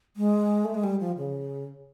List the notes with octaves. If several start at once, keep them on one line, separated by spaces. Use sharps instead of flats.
G#3
A3
G#3
G3
F3
C#3